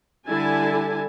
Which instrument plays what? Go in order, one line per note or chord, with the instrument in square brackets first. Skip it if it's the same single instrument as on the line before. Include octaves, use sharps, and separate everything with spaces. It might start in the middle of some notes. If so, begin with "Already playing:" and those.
[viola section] D3 G3 E4 G#5 A5